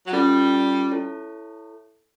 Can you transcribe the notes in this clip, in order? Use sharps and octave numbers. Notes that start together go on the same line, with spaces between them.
F#3
G3 C#4 F4 A4
E4 A4 C#5